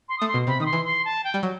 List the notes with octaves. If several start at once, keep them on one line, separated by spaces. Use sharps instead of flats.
C6
A3 D#6
C6
B2
C3 B5
D#3 D#6
C6
E3
C6
A5
G5
G3
F#3